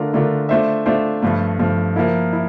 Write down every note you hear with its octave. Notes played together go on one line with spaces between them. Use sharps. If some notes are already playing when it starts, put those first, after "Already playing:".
Already playing: D3 A3 D4 F4 A#4
D3 A3 D4 F4 A#4
A3 D4 F4 C5 E5
A3 D4 F4 C5 E5
G2 F3 A3
G2 F3 A3
F3 A#3 E4
E4